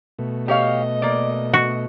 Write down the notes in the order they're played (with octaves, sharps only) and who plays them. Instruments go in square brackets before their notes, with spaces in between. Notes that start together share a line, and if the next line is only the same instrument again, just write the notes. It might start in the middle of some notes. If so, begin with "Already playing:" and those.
[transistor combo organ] B2 A3
[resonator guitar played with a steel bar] G4 C#5 F5 [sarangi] D#5
[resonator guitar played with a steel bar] A#3 D5
[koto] F#4